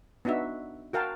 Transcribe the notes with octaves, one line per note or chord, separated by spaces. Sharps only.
B3 D4 D#4 F#4 E5
F#4 A#4 F5 G5 A5